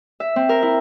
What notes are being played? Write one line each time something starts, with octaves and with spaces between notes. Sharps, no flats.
E5
C4
A#4
E4